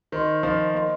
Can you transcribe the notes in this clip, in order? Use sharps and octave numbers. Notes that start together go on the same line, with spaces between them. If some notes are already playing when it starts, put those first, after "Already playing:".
D#3 C5 D#5 C6
F3 C5 D#5 C6
A#3 C5 D#5 C6